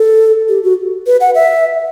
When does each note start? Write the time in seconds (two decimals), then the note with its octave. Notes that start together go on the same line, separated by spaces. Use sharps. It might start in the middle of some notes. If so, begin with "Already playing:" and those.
Already playing: A4
0.49 G4
0.63 F#4
1.07 B4
1.21 F#5
1.35 E5